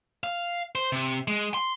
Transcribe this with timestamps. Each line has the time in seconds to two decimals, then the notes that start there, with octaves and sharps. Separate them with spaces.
0.24 F5
0.75 C5
0.92 C3
1.28 G#3
1.54 C6